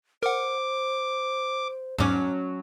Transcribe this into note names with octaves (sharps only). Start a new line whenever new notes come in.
A#4 C5 F#5 D6
E2 G#2 F#3 C#4 D6